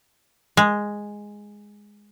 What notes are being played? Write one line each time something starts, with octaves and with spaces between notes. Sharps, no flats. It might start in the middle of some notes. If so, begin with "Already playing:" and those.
G#3